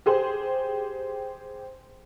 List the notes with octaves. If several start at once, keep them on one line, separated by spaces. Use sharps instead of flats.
G4 G#4 C5